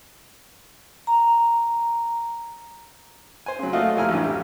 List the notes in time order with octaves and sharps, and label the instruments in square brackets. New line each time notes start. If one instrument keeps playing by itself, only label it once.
[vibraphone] A#5
[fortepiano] C5 G#5
C#3 F#3
A3 A#3 F4 F#4 D#5 F5
F2 C3 E4 G#5 A#5 F6
A1 G2
G4